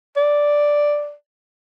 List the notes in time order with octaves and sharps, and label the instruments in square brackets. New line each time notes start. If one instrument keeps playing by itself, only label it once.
[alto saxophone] D5